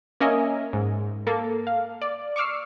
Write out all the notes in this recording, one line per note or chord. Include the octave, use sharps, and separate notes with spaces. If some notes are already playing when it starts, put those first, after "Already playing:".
A#3 C#4 A#4 D#5 E5 G#5
G#2
A#3 A4
F5
D5
C#6 D6 E6 F6 C7